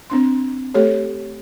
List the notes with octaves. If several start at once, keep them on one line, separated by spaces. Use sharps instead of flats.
C4 D4 C6
A3 G4 A4 C#5